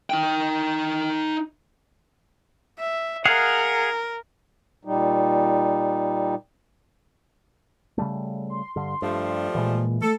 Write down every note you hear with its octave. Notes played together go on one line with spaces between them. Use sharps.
D#4 G5
E5
G#4 A#4 F5 F#5
A#2 G3 D#4
C#3 G3 A3
C6
G2 D3 C6
G2 F3 G3 A3
A#2 E3 G#3
A3 A4